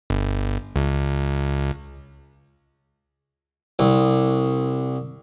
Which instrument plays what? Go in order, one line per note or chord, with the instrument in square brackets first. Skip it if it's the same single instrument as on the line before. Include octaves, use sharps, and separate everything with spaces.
[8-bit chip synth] G1
C#2
[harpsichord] C2